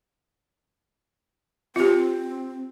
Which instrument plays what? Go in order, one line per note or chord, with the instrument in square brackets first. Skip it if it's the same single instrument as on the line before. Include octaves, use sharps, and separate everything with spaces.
[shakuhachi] C4 [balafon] F4 G4